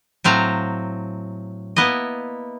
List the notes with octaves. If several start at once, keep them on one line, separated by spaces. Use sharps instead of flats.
A2 F#3 C4 F5 A#5
A#3 B3 E4 D#5